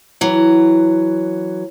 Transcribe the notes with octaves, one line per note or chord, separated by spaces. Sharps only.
E3 F#3